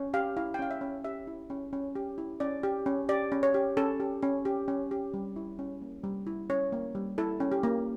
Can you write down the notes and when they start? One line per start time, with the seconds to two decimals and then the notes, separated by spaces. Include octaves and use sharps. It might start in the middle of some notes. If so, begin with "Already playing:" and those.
Already playing: C#4
0.14 G4 F5
0.37 E4 F5
0.54 G5
0.59 C#4 F5
0.71 E5
0.81 C#4
1.04 G4 E5
1.27 E4
1.50 C#4
1.73 C#4
1.96 G4
2.18 E4
2.40 C#4 D5
2.63 G4
2.86 C#4
3.09 G4 D5
3.32 C#4
3.43 C#5
3.54 G4
3.77 C#4 A4
4.00 G4
4.23 C#4
4.45 G4
4.68 C#4
4.91 G4
5.14 G3
5.36 E4
5.59 C#4
5.82 A#3
6.04 G3
6.27 E4
6.50 C#4 C#5
6.72 A#3
6.95 G3
7.18 E4 A4
7.40 C#4
7.52 G4
7.63 A#3